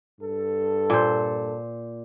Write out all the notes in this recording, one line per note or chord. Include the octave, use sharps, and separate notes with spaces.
G2 A4
A#2 C5